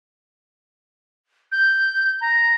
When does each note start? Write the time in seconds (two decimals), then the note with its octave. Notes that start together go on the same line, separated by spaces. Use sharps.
1.52 G6
2.21 A#5